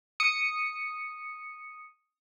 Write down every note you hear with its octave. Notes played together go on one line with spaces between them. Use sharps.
D#6 C#7